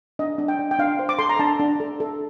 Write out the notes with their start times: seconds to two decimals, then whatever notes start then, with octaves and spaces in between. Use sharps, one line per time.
0.19 D4 D#5
0.38 D4
0.48 G5
0.59 D4
0.71 G5
0.79 D4 F5
0.99 C5
1.09 D6
1.19 A4 C6
1.29 A#5
1.39 D4 A5
1.59 D4
1.80 A4
2.00 A4